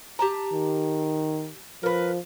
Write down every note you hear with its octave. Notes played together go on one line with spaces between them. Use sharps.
G4 A5 A#5
D#3
F3 A#4 B4